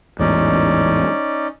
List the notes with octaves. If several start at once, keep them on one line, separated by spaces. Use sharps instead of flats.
A1 E2 G#2 C#4 D#4 D5